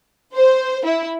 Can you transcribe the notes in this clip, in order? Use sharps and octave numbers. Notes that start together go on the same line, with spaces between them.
C5
E4